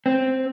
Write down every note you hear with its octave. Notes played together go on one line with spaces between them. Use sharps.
C4